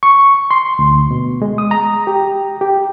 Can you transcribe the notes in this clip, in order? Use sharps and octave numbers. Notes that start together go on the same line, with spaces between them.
C#6
C6
D2
B2
G#3
D#6
A#5
G4
G4